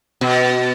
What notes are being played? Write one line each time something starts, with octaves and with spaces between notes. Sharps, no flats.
B2